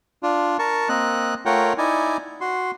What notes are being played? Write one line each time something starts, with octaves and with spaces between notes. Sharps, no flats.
D4 F4
A#4 A5 C#6
A#3 C4 D#5 F#6
A3 F4 A#4 C#5 F#5 G5
D#4 E4 D5 G#5
F#4 C6